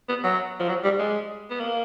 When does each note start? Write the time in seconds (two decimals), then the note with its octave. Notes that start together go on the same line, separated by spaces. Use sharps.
0.09 B3
0.24 F#3
0.59 F3
0.69 F#3
0.84 G3
0.99 G#3
1.50 B3
1.60 A#3